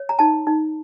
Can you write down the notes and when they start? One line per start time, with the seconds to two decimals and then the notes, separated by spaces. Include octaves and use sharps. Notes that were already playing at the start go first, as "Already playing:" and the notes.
Already playing: C#5
0.09 A#5
0.19 D#4 A5
0.47 D#4